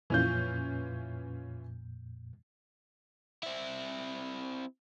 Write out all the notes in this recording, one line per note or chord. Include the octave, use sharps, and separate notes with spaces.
F2 A#2 E3 C#4 F4 G6
C4 E4